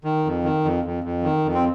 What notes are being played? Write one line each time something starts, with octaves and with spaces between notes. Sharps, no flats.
D#3
F2
D#3
F2
F2
F2
D#3
F2
C4